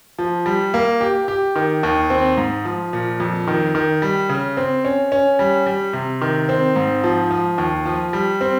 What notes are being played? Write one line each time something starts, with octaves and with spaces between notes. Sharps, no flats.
F3
G3
A#3
G4
G4
D#3
D#2
C4
G#2
F3
A#2
F2
D#3
D#3
G3
C#3
C4
C#4
C#4
G3
G3
C3
D#3
C4
G#2
F3
F3
D#2
F3
G3
C4